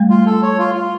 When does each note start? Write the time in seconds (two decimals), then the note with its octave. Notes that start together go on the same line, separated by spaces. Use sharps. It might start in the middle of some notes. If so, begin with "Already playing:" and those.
Already playing: G3 A3
0.10 F4
0.26 A4
0.43 C#5
0.59 F4
0.75 F4